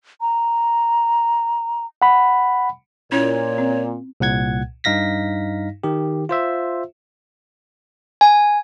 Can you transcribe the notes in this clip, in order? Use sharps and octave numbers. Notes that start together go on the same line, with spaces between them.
A#5
F#5 B5
A#2 C#4 E4 C#5
C4
C2 A#2 F#5 G#6
G2 D#4 F5 A#6 B6
D#3 G4
F4 C5 E5
G#5